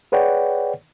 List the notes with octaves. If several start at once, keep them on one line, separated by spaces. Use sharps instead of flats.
G#4 B4 C#5 D5 F#5 G5